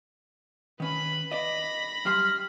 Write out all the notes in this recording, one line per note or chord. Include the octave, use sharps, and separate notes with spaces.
D#3 C#4 B4 B5
D5 D#5 B5 A#6
F#2 G3 C6 F6